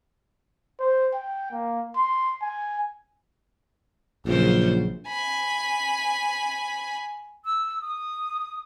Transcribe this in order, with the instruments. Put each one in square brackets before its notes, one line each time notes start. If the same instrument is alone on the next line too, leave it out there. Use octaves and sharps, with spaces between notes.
[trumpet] C5
G5
A#3
C6
G#5
[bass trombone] A#1 [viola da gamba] F#2 C#3 C5
[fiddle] G#5 B5
[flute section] E6
D#6